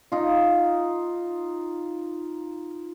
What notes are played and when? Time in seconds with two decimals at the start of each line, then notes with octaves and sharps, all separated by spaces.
0.12 D#4 F4